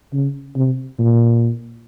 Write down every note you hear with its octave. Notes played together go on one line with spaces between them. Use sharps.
C#3
C3
A#2